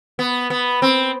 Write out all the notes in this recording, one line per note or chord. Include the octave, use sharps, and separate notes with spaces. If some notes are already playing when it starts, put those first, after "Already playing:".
B3
B3
C4